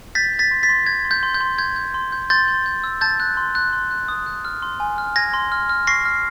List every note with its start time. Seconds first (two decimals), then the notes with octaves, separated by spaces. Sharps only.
0.15 G6 A6 B6
0.33 G6
0.39 A6 B6
0.51 C6
0.63 A6 B6
0.69 C6
0.86 G6 G#6
1.05 C6
1.11 G6
1.23 C6
1.34 G6
1.41 C6
1.58 G6 G#6
1.76 G6
1.94 C6
2.12 G6
2.30 C6 G6 A6
2.48 C6
2.66 G6
2.84 E6
3.01 A5 G6 A6
3.20 F#6
3.37 C6
3.55 F#6
3.73 C6
3.91 F#6
4.08 D#6
4.26 F#6
4.45 F6
4.63 C6
4.80 G#5
4.98 F6
5.16 G#5 G#6 A#6
5.34 C6
5.52 F6
5.69 F6
5.87 C#6 A#6 C7
6.05 F6